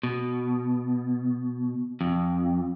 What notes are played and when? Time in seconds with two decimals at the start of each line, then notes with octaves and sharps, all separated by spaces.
0.03 B2
2.01 F2